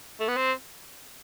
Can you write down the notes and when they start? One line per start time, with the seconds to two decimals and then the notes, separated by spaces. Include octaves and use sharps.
0.20 A3
0.28 B3
0.37 C4